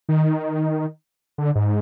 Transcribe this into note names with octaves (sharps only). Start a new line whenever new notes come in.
D#3
D3
G#2